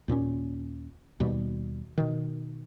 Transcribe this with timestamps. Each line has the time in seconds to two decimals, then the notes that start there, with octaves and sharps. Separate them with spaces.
0.08 D#2 A#2 C4 C#4
1.20 D#2 B2 G3
1.98 B2 D#3